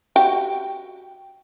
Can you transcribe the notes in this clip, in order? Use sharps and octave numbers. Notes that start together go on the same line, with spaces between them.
F#4 G4 G5